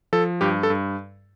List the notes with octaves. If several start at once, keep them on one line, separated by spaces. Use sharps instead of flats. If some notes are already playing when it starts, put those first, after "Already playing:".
F3 A4
G2 G4
A4
G2